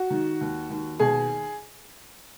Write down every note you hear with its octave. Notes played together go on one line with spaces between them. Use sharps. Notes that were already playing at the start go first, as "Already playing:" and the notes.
Already playing: F#4
D#3
D#2
D#2
B2 G#4